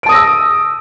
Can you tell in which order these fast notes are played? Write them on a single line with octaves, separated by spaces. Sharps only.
D7 A5 D#6 A#6 E6